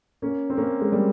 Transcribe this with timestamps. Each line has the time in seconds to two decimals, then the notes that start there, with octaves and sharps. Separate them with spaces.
0.22 A#3 C#4
0.50 C4
0.57 A#3 C#4
0.81 G#3
0.92 G3 A#3